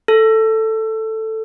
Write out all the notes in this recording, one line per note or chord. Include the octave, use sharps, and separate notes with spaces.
A4